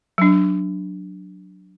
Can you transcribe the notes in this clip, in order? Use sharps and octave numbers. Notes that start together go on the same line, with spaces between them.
F#3 D4